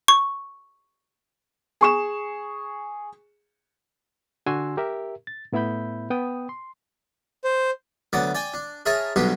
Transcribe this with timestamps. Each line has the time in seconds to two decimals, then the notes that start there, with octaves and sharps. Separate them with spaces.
0.08 C#6
1.81 G#4 C#6 E7
4.46 D3 D4 F#4 G#5 C6 E6
4.77 G4 A#4 E5
5.27 A6
5.52 A2 B3 E4 E5 B5 G6
6.10 B3 G5 D#6
6.49 C6
7.44 C5
8.13 D2 F#3 B3 D5 D6
8.35 D5 G5 G#5
8.54 D4
8.86 G#4 A#4 C#5 E5 A5
9.16 B1 G2 B2 F#3 G4 C5